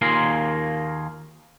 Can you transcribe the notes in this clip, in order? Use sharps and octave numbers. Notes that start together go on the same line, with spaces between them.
D#2 A#3 F4 G#4 A#4 C6